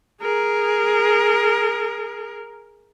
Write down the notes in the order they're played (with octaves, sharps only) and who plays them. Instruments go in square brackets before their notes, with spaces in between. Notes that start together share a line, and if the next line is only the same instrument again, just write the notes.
[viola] G#4 A#4